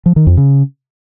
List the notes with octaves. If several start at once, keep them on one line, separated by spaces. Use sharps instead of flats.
F3
D#3
F2
C#3